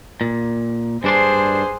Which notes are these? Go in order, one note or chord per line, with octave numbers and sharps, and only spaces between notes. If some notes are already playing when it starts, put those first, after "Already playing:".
A#2
G2 D4 G#4 C5 C6